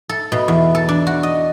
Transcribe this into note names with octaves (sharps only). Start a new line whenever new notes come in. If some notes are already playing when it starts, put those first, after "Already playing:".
A4
B2
E2
A4
D4
F#4
D#5